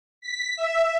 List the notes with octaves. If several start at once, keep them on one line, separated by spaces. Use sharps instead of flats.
B6
E5